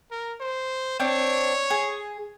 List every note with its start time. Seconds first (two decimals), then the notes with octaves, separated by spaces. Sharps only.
0.11 A#4
0.41 C5
1.00 C4 D4 C#5
1.70 G#4